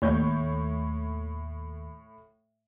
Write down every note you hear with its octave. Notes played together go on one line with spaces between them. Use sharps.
D#2 A2 C#5 G6